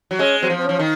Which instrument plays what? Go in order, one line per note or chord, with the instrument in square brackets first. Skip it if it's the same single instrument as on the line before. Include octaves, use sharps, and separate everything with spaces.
[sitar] F#3
[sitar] G#3 [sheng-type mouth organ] C#4
[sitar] F#3 [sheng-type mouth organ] C4
[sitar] F3
[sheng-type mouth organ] C4
[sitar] F3 [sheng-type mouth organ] C#4
[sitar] D#3